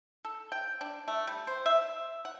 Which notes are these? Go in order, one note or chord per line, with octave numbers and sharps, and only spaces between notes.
A4
G5
D4
A3
G3
C5
E5
F#5